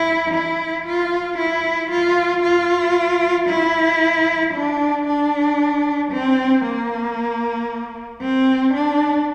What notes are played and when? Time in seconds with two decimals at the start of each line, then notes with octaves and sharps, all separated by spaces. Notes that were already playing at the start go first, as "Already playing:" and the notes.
Already playing: E4
0.34 E4
0.86 F4
1.38 E4
1.90 F4
2.43 F4
3.49 E4
4.53 D4
5.06 D4
6.11 C4
6.64 A#3
8.21 C4
8.73 D4